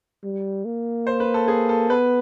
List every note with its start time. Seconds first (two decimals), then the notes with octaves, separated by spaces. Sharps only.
0.24 G3
0.65 A#3
1.07 C5
1.20 B4
1.34 A4
1.48 G#4
1.69 A4
1.90 B3 B4